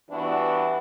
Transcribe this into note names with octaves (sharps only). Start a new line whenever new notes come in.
G2 E3 B3 D4 E4 F#4